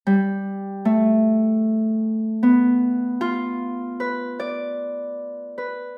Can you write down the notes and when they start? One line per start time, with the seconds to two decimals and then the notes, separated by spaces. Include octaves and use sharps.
0.07 G3
0.85 A3
2.43 B3
3.21 F4
4.00 B4
4.40 D5
5.58 B4